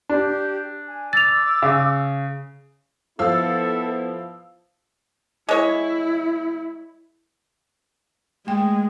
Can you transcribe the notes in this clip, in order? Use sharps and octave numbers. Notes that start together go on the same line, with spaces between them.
D4 G4
G#5
D6 E6 A6 F7
C#3
F3 B3 E4 A4 F5 E6
G#3 E4 C#5
G#3 A3 G5